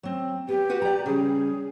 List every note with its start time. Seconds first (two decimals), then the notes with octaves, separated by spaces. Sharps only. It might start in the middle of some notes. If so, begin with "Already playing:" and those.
0.03 F#3 C4
0.48 B3 G4
0.69 F#4 B4 F#5
0.82 D5 A#5
1.06 C#3 G3 G#4